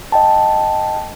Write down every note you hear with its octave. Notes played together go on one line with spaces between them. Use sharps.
D#5 G5 A5